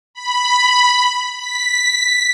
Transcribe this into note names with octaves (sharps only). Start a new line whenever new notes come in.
B5
B6